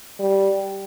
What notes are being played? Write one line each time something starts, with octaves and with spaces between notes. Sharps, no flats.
G3